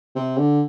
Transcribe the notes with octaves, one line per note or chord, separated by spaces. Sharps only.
C3
D3